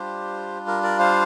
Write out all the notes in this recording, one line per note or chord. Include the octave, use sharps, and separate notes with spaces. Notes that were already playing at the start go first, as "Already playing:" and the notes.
Already playing: G3 D4 F4 G4 C5
A#4
A#4 D5
C5 F5